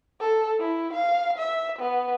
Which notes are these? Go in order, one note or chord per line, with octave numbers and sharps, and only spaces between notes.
A4
E4
F5
E5
B3